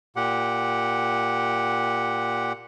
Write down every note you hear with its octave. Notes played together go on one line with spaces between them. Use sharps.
A#2 G4 F#5